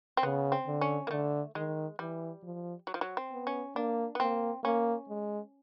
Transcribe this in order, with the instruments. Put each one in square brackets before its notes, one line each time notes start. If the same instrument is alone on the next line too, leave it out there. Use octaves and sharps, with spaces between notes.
[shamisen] C4
[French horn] C#3 [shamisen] B3
[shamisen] C4
[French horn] D3
[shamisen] C#4
A#3
[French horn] D3 [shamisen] A3
[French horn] D#3 [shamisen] G#3
[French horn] E3 [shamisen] G3
[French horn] F3
[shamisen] F#3
F3
F#3
C4
[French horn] B3
[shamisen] C#4
[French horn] A#3 [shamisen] D4
[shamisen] B3
[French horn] A#3 [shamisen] C4
[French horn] A#3 [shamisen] C#4
[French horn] G#3